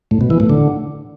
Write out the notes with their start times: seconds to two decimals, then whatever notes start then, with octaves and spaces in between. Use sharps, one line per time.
0.11 A2
0.21 B2
0.30 E3
0.40 A2
0.50 D3